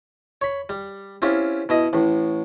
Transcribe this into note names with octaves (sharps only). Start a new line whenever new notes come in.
C#5 B5
G3
C4 C#4 E4 F4 G4
B2 E4 D#5
A1 A2